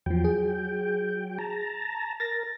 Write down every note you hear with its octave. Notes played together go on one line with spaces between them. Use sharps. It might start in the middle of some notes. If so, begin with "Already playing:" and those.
E2 F3 F#3 G5
G#4
A5 A#5
A#4 A6 A#6